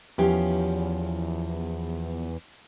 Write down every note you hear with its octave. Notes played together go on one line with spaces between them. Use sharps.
E2 F3 C#4 G4